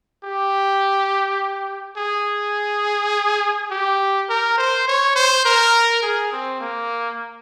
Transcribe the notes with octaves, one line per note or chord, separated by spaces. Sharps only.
G4
G#4
G4
A#4
C5
C#5
C5
A#4
G#4
C4
A#3